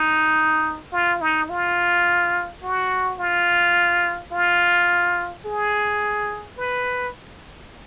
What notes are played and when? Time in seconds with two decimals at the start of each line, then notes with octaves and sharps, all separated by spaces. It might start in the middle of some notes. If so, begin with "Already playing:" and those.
Already playing: D#4
0.92 F4
1.21 D#4
1.49 F4
2.63 F#4
3.19 F4
4.32 F4
5.45 G#4
6.58 B4